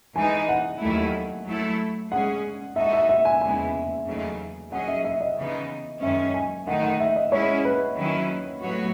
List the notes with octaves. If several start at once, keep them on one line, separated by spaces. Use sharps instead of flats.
E3 G#3 D#4 G#5
F#5
D#2 D#3 F#3 A3 E4
F#3 A3 E4 A4
G#3 C#4 G#4 F#5
G#3 D#4 F#4 A4 D#5 E5
E5
E5
G#5
E2 C#3 G#3 B3 E4 G#5
E2 C#3 F#3 A3 D#4
F#3 C#4 G#4 D#5 F#5
E5
E5
D#5
C#3 E3 B3 D#4
F#2 D#3 G#3 C#4 E5
G#5
D#3 A3 D#4 F#5
F#5
E5
D#5
G#3 C#4 E4 C#5
B4
D#3 F#3 C#4 E4
A2 F#3 B3 F#4 C#5